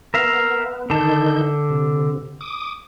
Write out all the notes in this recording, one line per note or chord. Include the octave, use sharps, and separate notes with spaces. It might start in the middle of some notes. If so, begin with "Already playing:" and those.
B3 A#4 E5 F5
D3 D#3 D#4 A5 G6
C3
D6 D#6